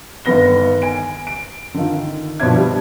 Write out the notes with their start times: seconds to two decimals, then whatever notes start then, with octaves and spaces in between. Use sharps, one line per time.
0.25 G1 D#3 B3 A#6 G7
0.82 G#5 D7
1.27 D7
1.74 D3 D#3 F4
2.40 B2 F3 B3 D4 E5 G#6
2.57 G3 D4